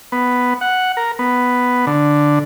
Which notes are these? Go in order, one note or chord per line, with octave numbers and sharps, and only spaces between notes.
B3
F#5
A#4
B3
D3